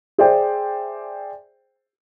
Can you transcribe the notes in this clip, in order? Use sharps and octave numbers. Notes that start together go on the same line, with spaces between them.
G#4 C5 D5 E5 G5